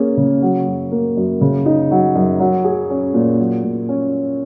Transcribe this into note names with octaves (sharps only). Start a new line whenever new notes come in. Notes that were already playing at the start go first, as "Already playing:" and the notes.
Already playing: A#3 C#4 G#4
C#3
F#3
F#2
A#3
F#2
C#3
D#4
F#3
F#2
F#3
G#4
C#4
A#2
F#3
A#2
C#4